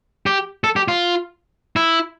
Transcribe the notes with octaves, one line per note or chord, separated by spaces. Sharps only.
G4
A4
G4
F4
E4